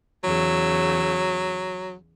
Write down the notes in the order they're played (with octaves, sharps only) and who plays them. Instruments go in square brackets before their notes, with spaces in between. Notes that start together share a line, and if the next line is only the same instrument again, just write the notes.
[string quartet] E2 C#3 E6 [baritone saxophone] F#3